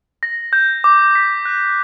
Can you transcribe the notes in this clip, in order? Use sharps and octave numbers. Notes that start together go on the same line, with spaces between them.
A#6
G6
D6
B6
F#6